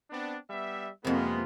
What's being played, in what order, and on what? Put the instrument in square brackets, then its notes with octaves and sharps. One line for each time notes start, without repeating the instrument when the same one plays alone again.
[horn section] B3 C4 D4
G3 B3 E5
[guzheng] F2 C3 [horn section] G#3 B3 [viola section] A#3 F4